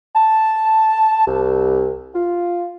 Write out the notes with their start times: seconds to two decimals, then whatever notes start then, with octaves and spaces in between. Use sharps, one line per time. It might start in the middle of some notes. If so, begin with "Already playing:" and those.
0.16 A5
1.27 C2
2.15 F4